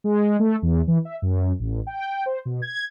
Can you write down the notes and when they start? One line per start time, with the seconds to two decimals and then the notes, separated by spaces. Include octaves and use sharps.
0.04 G#3
0.39 A3
0.62 E2
0.87 E3
1.05 E5
1.22 F#2
1.59 A1
1.87 G5
2.26 C5
2.45 B2
2.62 G#6